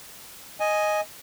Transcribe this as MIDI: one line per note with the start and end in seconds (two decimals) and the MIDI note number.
0.60 1.01 75
0.60 1.01 80